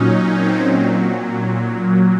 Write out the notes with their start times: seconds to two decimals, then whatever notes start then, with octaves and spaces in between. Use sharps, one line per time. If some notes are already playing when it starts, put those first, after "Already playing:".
Already playing: A#2 F#3 C#4 D#4
0.31 C4
0.60 A#2 F#3